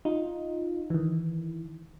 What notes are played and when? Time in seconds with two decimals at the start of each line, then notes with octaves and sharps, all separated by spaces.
0.05 D#4 F4
0.90 D#3 E3